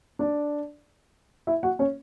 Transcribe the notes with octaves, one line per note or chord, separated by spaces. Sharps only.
D4 D5
E4 E5
F#4 F#5
C#4 C#5